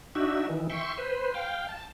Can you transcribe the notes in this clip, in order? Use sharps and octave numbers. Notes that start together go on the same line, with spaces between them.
D4 D#4 F#4 E5
D#3 E3
E5 G5 C6 C#6
B4 C5
F5 G5
A5